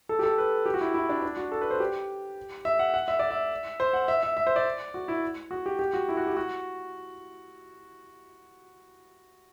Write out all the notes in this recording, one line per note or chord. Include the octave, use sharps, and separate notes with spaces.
A4
G4
A4
B4
G4
F#4
E4
E4
D4
D4
F#4
A4
B4
C5
G4
E5
F#5
F#5
E5
D5
E5
C5
F#5
E5
E5
E5
C5
D5
F#4
E4
F#4
G4
G4
F#4
E4
F#4
G4
F#4